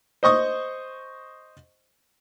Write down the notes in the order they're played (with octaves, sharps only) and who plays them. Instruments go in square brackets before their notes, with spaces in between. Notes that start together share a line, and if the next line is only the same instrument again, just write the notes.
[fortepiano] C5 D#5 C#6 D#6